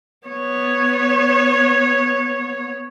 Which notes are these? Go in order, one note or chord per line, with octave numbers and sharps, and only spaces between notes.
B3 C#5